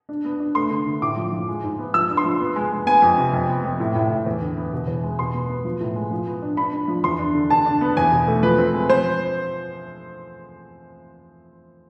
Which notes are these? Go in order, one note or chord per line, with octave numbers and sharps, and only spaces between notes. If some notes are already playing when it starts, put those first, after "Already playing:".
D4
B3
D4
A3 C6
D3
D3
A2 D6
F3
F3
G#3
G#2
B3
F3 E6
D4
C6
F3
B3
G#3
G#3
B3 G#5
F2
C3
F2
B3
F2
A2
A2
A2
E2
D3
B3
B2
E2
G#3
B2 C6
B3
B3
F3
A2
G#3
F3
B3
D4
D4 B5
D4
F3
E2 C6
D4
D3
D4 A5
D4
B3
E2 G#5
B2
A3
F3 B4
C4
G#3
F3 C5